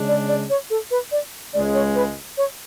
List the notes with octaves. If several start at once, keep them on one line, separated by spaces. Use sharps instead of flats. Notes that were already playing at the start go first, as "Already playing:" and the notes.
Already playing: C#3 G#3 D4
D5
D5
C#5
A4
B4
D5
C#2 C#3 G#3 D5
C#5
B4
C#5